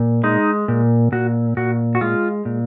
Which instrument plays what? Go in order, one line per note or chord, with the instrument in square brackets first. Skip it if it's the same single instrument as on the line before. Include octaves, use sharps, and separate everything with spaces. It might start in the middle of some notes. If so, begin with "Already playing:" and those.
Already playing: [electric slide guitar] A#2
G#3 D#4
A#2
A#2 F#4
A#2 F#4
F#4
G#3 F4
A#2